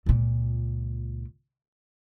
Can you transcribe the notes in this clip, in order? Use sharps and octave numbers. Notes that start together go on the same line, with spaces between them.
C#2 A#2